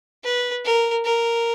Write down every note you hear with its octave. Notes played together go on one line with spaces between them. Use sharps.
B4
A#4
A#4